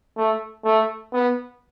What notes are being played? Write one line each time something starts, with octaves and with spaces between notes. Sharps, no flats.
A3
A3
B3